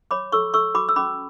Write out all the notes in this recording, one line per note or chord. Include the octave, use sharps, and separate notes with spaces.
C#5 B5 D6
A4 C#6 E6
A4 C#6 E6
F#4 B5 D6
E6
C#4 B5 D6